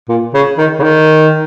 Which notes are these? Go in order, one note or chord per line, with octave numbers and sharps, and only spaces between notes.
A#2
C#3
D#3
C#3
D#3